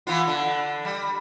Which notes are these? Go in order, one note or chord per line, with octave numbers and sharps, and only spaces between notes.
E3 B3 F4
D3
G3